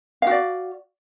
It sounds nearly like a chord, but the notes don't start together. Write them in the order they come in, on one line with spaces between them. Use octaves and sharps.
F5 F#4 D5